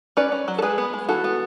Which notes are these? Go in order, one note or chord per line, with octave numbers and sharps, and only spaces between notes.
C#4 B4 D5
C#4
F#3
A4
G#3 G#4 B4
B3
G#3
E3 F#4 A4
B3